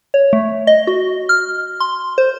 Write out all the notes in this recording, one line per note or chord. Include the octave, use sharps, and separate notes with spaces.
C#5
A3
D#5
F#4
F6
C6
C5